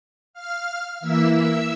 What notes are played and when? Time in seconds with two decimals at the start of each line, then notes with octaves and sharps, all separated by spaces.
0.33 F5 F6
1.00 E3 A#3 E4 E5 E6
1.34 E5 E6